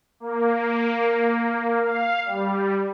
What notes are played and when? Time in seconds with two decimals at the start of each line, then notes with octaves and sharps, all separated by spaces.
0.20 A#3
1.80 F5
2.26 G3